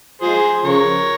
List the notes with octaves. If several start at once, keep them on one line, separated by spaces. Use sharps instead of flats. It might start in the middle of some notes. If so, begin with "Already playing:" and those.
F3 G#3 G#4 C5
C#3 F3 A#4 C#5